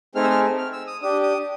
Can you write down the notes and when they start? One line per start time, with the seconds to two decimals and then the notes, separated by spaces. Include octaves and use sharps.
0.15 A3 C4 D#4 G#4 F6
0.23 E6
0.30 F6
0.58 F6
0.73 E6
0.87 D#6
1.02 D4 G4 D#6
1.23 D#6